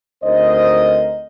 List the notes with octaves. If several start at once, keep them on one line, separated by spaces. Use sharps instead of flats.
D2 C4 D#4 A#4 C5 D#5